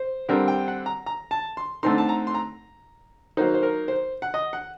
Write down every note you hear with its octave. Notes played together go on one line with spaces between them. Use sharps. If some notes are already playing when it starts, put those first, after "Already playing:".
Already playing: C5
D3 G3 C4 A#4
G5
F#5
A#5
A#5
A5
C6
D3 A3 C4 D#4 C6
A5
A#5
C6
A#5
F#3 A#3 D#4 C5
C5
A#4
C5
F#5
D#5
F#5